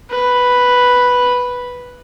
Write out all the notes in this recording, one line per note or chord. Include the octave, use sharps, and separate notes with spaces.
B4